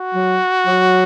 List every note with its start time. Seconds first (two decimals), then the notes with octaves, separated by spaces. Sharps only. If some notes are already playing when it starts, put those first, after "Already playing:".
Already playing: F#4
0.15 F#3
0.67 F#3